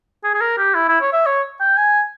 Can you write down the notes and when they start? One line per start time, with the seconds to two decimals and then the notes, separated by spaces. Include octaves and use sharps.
0.24 G#4
0.34 G#4
0.41 A#4
0.58 G4
0.75 E4
0.89 E4
1.01 C#5
1.13 E5
1.26 C#5
1.60 G5
1.77 G#5